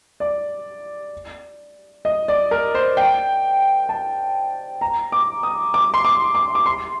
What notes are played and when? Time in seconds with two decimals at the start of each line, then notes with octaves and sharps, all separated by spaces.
0.20 D5
2.05 D#5
2.28 D5
2.51 A#4
2.75 C5
2.97 G5
3.89 A5
4.81 A#5
5.12 D6
5.43 D#6
5.74 D6
5.94 C6
6.05 D6
6.35 D6
6.55 D6
6.66 C6